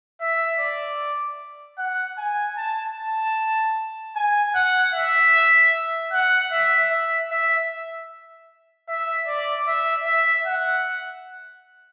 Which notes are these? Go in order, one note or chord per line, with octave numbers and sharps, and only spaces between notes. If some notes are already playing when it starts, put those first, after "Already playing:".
E5
D5
F#5
G#5
A5
A5
G#5
F#5
E5
F#5
E5
E5
E5
E5
D5
E5
E5
F#5